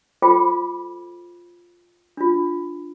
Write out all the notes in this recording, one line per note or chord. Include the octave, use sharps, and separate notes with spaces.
F4 A4 C5 G5 B5 D6
D4 F4